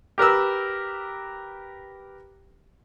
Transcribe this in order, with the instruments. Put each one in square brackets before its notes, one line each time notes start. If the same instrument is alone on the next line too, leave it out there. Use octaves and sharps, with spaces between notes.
[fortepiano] G4 A#4 B4 E6